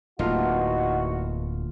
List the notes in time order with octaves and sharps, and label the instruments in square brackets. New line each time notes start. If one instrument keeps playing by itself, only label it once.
[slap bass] D1 [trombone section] E2 F#4 [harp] A3 A#3 F4 [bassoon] D#4